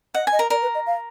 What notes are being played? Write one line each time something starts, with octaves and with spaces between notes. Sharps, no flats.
D#5 F#5
G#5
D#5
A#4
A#4 D5
B4
D#5
F5